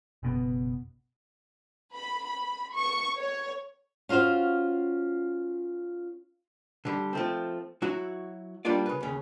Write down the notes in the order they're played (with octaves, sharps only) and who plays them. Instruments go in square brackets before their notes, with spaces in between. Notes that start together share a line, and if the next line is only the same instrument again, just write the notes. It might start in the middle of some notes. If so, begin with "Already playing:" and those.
[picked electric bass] F#1 B2 B3
[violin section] B5
B5
C#6
C#5
[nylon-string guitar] C#4 F4 F#4 C5 F5
[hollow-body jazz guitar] D3 G3
F3 A3 C4
F#3 E4 F#4
G3 A#3 D4 F4 D5
C#3 B4
D#2 C#3